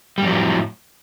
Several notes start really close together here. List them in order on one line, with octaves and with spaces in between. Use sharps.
G3 F2 F#3 A2